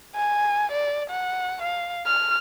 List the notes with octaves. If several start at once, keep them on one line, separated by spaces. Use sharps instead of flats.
G#5
D5
F#5
F5
F6